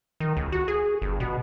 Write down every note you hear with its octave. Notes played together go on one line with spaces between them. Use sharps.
D#3
C#2
F#4
G#4
G1
B2